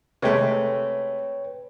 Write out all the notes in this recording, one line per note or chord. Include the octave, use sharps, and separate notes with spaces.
C3 G#3 A3 B4 C#5 G5